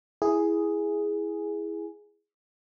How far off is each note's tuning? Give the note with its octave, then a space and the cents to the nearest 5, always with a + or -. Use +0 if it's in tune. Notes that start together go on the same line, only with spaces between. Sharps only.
E4 +0 G#4 +0